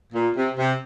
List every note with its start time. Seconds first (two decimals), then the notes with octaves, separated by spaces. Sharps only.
0.13 A#2
0.36 C3
0.57 C3